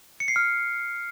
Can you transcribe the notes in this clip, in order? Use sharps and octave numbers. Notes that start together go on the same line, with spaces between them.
C#7
C7
F6